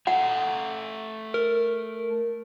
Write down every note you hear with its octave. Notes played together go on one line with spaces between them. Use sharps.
A3 F#5 G#5 A#5
A#4